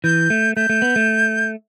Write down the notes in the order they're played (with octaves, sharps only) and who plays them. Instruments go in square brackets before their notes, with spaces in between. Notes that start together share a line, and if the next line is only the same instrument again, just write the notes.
[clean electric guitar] E3 [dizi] G6
[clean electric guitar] A3
[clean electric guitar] A3 [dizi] G6
[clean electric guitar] A3
B3
A3